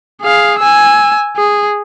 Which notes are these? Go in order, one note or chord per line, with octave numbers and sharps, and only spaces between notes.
G#4 F5
G#5 E6
G#4